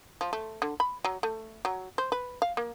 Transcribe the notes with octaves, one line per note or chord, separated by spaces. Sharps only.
F3
A3
D3
B5
F#3
A3
F#3
C5
B4
F5
A#3